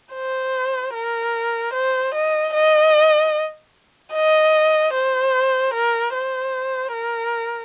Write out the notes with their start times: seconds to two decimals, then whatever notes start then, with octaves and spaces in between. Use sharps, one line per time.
0.14 C5
0.94 A#4
1.73 C5
2.14 D#5
2.54 D#5
4.14 D#5
4.94 C5
5.74 A#4
6.14 C5
6.93 A#4